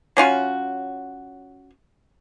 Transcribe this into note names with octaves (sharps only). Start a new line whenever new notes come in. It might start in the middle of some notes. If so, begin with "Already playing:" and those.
F#3 C#4 F4 F#4